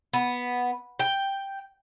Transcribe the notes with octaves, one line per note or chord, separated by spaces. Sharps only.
B3
G5